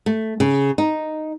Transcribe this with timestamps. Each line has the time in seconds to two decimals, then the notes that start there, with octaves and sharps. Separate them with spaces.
0.06 A3
0.40 C#3
0.78 D#4